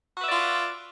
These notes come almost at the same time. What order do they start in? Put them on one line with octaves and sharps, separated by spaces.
F#4 B4 E5 D5 F4